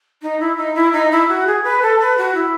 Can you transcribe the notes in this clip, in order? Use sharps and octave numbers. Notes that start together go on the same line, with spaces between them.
D#4
E4
D#4
E4
D#4
E4
F#4
G#4
B4
A4
B4
F#4
E4